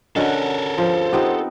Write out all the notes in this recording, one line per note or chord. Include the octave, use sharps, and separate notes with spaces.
D3 C#4 F#4 A4 A#4 D#5
F3 C5
B3 C4 D#4 F4 G4 F#5